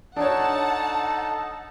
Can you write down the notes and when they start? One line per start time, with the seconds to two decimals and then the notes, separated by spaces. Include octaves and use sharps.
0.16 D4 D#4 A4 C#5 F#5 A5